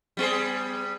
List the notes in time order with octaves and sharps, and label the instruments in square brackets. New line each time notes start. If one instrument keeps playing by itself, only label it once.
[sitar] G3 B3 G#4